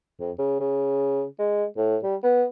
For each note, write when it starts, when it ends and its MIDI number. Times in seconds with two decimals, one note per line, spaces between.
0.19 0.31 41
0.39 0.56 49
0.60 1.24 49
1.39 1.64 56
1.77 1.97 45
2.03 2.16 55
2.23 2.45 59